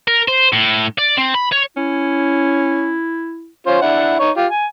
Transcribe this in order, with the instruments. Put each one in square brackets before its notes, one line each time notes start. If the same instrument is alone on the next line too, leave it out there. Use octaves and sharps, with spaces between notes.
[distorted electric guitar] A#4
C5
A2
D5
C4
B5
C#5
[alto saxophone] C#4 [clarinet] E4
[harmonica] C#4 F4 C5
D4 E4 F#5
D#4 C#5
F4 G4
G#5